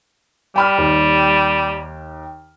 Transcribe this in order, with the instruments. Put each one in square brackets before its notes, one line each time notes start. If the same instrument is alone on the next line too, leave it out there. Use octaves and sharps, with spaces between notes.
[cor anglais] G3 [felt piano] G5 B5 F6
[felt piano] D#2